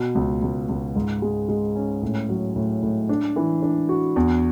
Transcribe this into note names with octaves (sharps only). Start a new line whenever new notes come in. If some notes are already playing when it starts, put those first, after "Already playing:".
Already playing: B2
C#2
C#2
C#2
G#2
G#3
G#3
C#4
A2
F#3
A2
A2
D4
E3
D4
F#4
E2